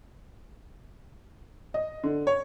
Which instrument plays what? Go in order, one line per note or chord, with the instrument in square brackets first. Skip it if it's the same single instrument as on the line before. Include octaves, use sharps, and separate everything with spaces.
[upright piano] D#5
D3
C#5